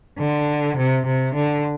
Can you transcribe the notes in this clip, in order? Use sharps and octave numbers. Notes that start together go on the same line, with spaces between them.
D3
C3
C3
D3